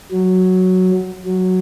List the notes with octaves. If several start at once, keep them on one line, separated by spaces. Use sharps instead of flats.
F#3
F#3